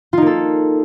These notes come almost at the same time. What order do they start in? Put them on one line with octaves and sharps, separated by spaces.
F4 D#4 A#3 A4